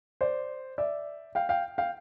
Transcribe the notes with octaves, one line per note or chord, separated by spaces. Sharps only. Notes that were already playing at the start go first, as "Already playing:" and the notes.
C5 D5
D5 E5
F5 G5
F5 G5
F5 G5